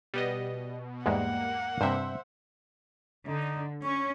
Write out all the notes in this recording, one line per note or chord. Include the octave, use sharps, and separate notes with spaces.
B2 G3 B3 D#5
E2 G#2 G3 G#3 A#3 F#5
G2 C3 C5 E5
D3 D#4
C#4 C#6